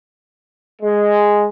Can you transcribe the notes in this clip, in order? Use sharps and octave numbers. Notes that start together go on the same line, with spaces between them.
G#3